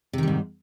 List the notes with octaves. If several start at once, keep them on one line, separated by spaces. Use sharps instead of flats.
G#2 C3 D#3 G3